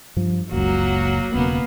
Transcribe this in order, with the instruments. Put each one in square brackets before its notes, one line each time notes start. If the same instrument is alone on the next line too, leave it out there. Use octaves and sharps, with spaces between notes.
[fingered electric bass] G2 F3
[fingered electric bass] F#1 C#2 [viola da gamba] F#3 A#3 F#4
[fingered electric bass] E1 C#3 [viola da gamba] A#3 B3